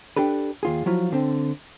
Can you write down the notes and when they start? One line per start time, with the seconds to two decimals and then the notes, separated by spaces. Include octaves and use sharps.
0.17 D4 G4 A4 B4
0.63 D#2 F4 G#4
0.86 F3 F#3 E4 F4
1.12 D3 C4